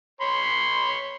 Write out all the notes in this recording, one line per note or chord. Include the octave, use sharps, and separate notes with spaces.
C#5 B5 C6